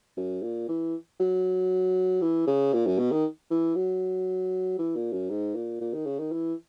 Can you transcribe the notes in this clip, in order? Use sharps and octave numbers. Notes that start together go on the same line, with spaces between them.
F#2
A#2
E3
F#3
E3
C#3
A#2
F#2
B2
D#3
E3
F#3
E3
A#2
F#2
G#2
A#2
A#2
D#3
C#3
D#3
E3